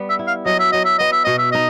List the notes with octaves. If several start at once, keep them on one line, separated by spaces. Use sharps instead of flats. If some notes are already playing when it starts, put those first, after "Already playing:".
Already playing: G3 B3
E5
E4
F5
F#3 D#5
E5
F#3 D#5
E5
B3 D#5
E5
B2 D#5
E5
D#4 D#5